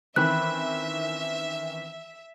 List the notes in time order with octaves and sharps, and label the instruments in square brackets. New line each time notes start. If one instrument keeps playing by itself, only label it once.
[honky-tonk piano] D#3 E3 C4 [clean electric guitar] C#4 B4 B5 [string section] E5 [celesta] F#6